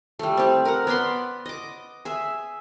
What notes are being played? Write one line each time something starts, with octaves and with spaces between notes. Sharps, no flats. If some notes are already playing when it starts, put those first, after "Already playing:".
G3 A3
C4 G4
A#4 F#5
B3 D5 B5 C6
D#5 D6
G#4 E5